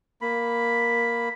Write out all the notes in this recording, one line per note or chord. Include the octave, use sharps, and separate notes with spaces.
A#3 B5